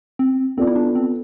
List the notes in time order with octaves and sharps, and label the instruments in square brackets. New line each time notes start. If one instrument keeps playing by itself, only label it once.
[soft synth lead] C4
[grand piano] B3 F4 A4 D5 [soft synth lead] C4
[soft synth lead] E4
D4
C4